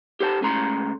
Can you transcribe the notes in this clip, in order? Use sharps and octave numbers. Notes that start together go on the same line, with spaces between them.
G4 A4 C5 F#5 A5
C#2 C#3 A3 A#5 C6